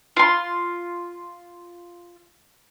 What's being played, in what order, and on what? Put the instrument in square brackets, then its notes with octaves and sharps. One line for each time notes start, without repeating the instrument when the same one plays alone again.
[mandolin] F4 C6